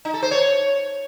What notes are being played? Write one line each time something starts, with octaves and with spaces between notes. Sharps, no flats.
D#4
A4
C5
C#5